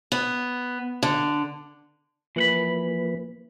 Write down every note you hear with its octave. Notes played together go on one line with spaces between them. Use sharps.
B3
D3
E3 F3 A#3 B4 F#5 B5